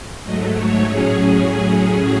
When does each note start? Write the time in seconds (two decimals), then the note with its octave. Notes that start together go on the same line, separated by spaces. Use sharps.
0.24 G#2 F#3 A3 D#5
0.55 C#5
0.85 A2 F#3 C#4 G#4